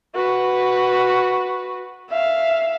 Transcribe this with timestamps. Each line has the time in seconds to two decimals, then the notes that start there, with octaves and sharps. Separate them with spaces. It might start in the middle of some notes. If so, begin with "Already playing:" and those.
0.16 F#4 B4
2.10 E5 F5